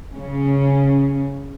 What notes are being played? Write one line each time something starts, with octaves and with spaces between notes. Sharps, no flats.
C#3 C#4